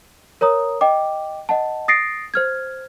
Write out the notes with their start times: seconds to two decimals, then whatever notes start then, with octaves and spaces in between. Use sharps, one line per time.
0.41 A#4 C#5 A#5 D#6
0.81 D#5 G5 D6
1.49 D#5 F#5 A5
1.88 D#6 A6 A#6 C7 D7
2.34 C5 F6 G#6